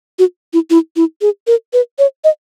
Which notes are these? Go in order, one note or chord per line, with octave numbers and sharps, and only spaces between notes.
F#4
E4
E4
E4
G#4
A#4
B4
C#5
D#5